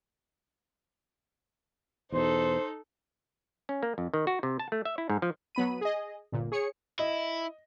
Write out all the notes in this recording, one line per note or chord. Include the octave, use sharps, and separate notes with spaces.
E2 B2 D#4 A4 C5
C#4
A#3
F2
D#3
F#4
C3
A5
A3
E5
E4
G#2
F3
F#3 B3 B5 D#7
G#4 D#5
G1 A#2
G#4 C#5 C#7
E4 D#5